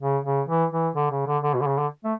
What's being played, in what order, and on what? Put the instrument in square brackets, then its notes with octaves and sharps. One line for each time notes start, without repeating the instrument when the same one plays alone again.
[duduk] C#3
C#3
E3
E3
D3
C#3
D3
D3
B2
D3
C#3
D3
A3